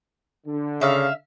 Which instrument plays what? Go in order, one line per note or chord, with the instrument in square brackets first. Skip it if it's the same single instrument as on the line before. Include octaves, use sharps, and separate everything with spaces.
[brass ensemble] D3
[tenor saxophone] C#3 [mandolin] E5 F5